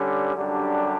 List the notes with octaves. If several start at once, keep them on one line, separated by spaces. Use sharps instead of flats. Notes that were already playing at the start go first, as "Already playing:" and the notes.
Already playing: D3 G3 C#4
F#2 D3 G3 D4 G4